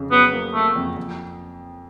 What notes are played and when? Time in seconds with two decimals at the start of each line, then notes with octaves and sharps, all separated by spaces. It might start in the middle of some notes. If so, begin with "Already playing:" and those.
Already playing: F2 C#3
0.12 F#3 B3
0.33 A#3
0.54 A3 A#3
0.76 F2
0.97 F2